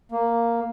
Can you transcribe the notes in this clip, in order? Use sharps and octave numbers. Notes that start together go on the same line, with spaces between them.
A#3